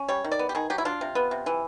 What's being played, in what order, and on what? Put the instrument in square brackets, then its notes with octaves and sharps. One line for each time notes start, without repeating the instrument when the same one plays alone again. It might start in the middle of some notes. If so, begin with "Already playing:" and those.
Already playing: [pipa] C#4
G3 C#5
D#3
D5
B3
G4
D#3 G#4
F#3 G4
E4
D4 F4
C3
B3
C3
E3